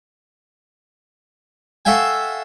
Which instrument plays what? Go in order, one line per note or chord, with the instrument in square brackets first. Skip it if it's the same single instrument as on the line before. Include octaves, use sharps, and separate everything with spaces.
[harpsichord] F#4 A4 E5 F5 G5 G#5